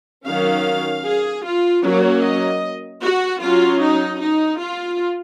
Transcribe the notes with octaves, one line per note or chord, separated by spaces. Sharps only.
D#3 F#3 C#4 F5
G#4
F4
F#3 A#3 C#4 F#4
D#5
F#4
F#3 C#4 F4
D#4
D#4
F4